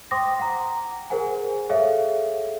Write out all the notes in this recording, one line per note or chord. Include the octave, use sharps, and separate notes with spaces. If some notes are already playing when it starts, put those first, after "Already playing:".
C5 G5 C6 D6 D#6 A#6
F#5 A#5
G#4 A#4 C5 F#5 G#5
G#4 A4 C#5 E5 F5